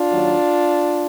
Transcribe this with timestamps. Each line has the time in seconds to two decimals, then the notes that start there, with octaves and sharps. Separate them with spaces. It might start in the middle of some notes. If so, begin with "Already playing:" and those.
Already playing: D4 F4
0.10 D#2 D#3 F#3